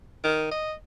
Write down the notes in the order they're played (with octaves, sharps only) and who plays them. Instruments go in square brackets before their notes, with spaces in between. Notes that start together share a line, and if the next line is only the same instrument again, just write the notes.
[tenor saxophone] D#3
D#5